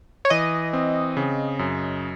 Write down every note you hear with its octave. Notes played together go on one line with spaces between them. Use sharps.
C#5
E3 D#5
C4
C#3
F#2